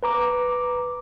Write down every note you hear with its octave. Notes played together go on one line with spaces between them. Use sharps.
B4 A#5 D6